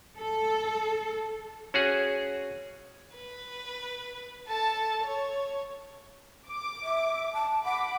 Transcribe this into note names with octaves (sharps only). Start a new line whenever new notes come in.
A4
C#4 F#4 G#4 C#5
B4
A4 A5
C#5
D6
E5
A5
F#5 B5 D6